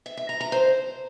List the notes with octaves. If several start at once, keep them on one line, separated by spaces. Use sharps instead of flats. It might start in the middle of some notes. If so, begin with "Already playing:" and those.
E5
E5
A#5
A#5
C5